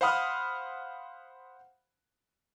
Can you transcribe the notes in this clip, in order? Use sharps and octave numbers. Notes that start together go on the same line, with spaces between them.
C5 F5 F#5 B5 D#6 F6